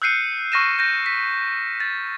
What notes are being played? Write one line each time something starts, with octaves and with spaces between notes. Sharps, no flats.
E6 F#6 G6 C7 C#7 D#7
C#6 F6 A#6 D#7 E7
G6 A#6
B6
A6